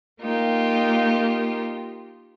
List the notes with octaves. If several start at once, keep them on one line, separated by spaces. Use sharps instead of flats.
A#3 D#4 F4 G4